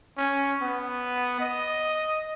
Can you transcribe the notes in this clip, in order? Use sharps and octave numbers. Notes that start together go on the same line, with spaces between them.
C#4
B3
D#5